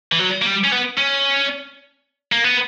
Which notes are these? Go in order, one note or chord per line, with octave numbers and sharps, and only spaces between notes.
E3
F#3
A#3
G3
C#4
B3
C#4
A#3
B3